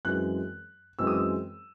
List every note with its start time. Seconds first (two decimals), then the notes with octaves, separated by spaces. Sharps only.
0.05 F#2 E3 G#3 C4 F#6
0.99 F#2 E3 G#3 C4 E6
1.07 D#6
1.14 E6